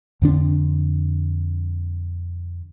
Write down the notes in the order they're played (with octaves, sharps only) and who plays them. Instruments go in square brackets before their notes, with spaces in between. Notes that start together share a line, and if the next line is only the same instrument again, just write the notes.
[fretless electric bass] F2 D3 D4